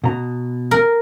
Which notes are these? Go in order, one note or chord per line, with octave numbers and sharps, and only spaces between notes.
B2 A#5
A#4